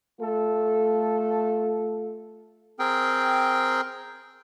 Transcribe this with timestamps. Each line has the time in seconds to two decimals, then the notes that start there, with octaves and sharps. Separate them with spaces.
0.21 A3 F4 A4
2.79 C4 G#4 A#4 G5